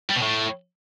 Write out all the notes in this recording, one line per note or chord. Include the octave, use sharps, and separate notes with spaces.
G3
B2
A2